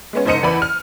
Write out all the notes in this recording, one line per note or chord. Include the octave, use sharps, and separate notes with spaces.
G#3 B3 C#4
F#1 G#2 C5 D#5 C#7 D#7
E2 E3 D5 B5
F6